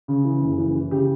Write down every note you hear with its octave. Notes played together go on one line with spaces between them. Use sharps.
C#3
E3
F#1
E3
E3
C#3 G4